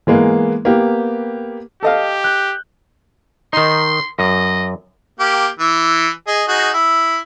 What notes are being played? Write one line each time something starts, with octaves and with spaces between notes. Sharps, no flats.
E3 G#3 A#3 B3
A#3 B3 G4
G4 A4 D#5 F5
F#6 G6
D#3 D#4 C6
F#2 D#5
A#3 G4
E3
G#4 D#5
D#4 F#4 G#4
E4